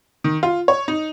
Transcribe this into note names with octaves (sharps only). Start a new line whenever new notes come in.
D#3
F4
C#5
D#4